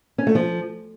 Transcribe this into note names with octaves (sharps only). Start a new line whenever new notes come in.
C#4
A3
F3